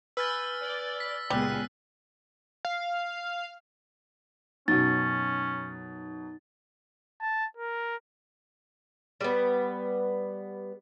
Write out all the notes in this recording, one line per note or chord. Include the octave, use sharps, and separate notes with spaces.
B4 G#5 E6 F6 G6 A6
D5
B6
C#2 A#2 G3 G#3 B3 G#4 E6 F#6
F5
F#2 B2 C#4 D#4 A6
A5
A#4
G3 B3